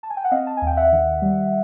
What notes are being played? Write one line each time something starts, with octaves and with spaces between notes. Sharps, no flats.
A5
G#5
G5
F#5
C4 D#5 F5
A5
G#5
D#2 G5
E5 F#5
D#3
G3